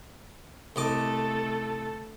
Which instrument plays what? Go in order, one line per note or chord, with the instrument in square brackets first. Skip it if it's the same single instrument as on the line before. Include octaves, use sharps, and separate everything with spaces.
[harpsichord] C2 D#5 D6 [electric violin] A3 A4